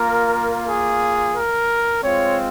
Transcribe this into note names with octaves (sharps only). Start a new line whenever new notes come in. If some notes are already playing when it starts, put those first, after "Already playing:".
Already playing: A#3 F4 A#4
G#4
A#4
G#3 C4 F4 C#5